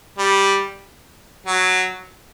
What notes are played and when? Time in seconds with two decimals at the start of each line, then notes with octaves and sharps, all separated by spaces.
0.18 G3
1.46 F#3